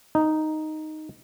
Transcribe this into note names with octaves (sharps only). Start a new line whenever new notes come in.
D#4